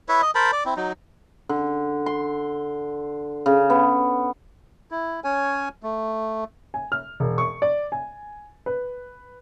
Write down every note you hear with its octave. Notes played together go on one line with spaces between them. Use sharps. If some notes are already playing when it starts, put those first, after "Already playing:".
E4 B4 C#5 E5
D#5
A#4 C5 A5 B5
D5
C4 E4
F#3 D#4
D3
C6
C#3
B3
E4
C#4 C#5 G#5
A3
G#5
F6
E1
C#6
D5
G#5
B4